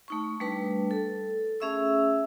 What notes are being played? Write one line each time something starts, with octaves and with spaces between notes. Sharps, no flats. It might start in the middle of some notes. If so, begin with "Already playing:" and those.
A3 D#4 C#6
G3 A3 D4 B4
A4
A3 C#4 G#4 E5 C#6 E6